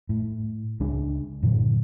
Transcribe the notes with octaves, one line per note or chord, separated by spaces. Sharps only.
A2
C#2 G#3 D4
G2 A#2 D3 F#3